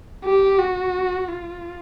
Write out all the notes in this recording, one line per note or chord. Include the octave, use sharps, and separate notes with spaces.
G4
F#4
F4